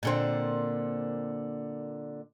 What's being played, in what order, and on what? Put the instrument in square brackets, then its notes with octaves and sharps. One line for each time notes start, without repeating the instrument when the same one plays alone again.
[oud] A#2 D3 C4